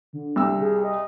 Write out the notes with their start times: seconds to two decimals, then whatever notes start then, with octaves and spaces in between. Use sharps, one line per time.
0.13 D3
0.36 C2 E6
0.61 G#4
0.84 D#5